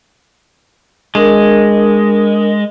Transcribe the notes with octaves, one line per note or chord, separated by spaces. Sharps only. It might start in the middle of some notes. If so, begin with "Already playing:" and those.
G#3 D4 A#4